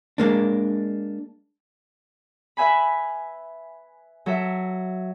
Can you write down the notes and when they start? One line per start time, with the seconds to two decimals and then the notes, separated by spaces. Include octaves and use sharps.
0.18 G#3 A#3 D4
2.57 B4 E5 G#5 B5
4.26 F#3 A4 E5